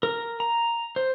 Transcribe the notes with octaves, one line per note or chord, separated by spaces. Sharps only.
A#4
A#5
C5